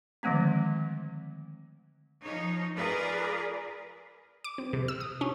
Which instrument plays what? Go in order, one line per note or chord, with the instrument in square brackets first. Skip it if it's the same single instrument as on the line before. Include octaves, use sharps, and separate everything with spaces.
[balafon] D3 D#3 F3 G#3 A3 C4
[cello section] F3 D#4 C#5
F4 G#4 A#4 B4 D5
[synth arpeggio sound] D6
C4
C3
E6
D#6
C#4